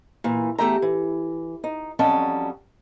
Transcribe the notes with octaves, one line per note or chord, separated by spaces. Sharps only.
A#2 E3
E2 E3 A3 G4 E5 A#5
E3
D#4
F2 F#3 G3 C#4 D#5 A5